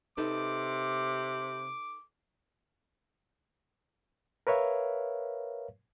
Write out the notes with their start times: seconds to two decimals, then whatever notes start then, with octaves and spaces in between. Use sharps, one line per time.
0.18 C3 D#4 A4 B4 D6
4.47 A#4 B4 C#5 E5 F5